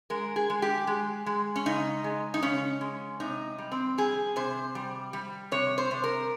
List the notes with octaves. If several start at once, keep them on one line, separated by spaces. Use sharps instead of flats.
G#3 A#4
G#4
G#3
G4
G#3
G#3
C#4
C#3 D#4
G#3
D#4
C#3 C#4
G#3
C3 D#4
G3
C4
G3 G#4
C3 C5
G3
G3
C3 C#5
C5
C3
A#4